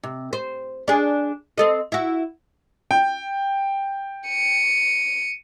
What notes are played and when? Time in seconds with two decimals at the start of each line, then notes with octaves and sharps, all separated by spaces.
0.03 C3
0.33 C5
0.88 D4 G#4
1.58 C4 A4 D#5
1.92 E4 F#4
2.91 G5
4.28 C#7 D#7